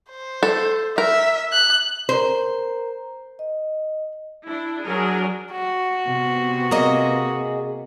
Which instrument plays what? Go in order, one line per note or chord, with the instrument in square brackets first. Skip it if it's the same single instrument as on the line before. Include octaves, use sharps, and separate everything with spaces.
[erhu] C5
[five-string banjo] A4
[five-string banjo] A#4 [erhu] E5
[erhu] F#6
[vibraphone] A#4 A#5 [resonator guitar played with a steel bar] C5
[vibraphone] D#5
[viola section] D4 E4
F#3 D4 G#4 A#4
[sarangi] F#4
[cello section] C3 B3
[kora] A#3 [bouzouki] G#4 D#5